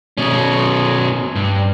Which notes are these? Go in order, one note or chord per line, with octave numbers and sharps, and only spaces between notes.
B2 C#4
G2